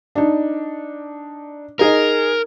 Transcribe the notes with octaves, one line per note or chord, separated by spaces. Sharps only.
D4 D#4
D#4 G#4 A#4 D#5